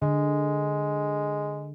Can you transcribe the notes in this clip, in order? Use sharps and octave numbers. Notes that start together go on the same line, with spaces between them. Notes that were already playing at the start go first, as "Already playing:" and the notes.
D3 G#3